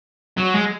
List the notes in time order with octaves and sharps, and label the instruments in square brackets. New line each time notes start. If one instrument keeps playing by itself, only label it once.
[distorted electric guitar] F#3
G#3